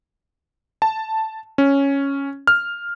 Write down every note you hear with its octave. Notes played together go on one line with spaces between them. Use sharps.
A5
C#4
F6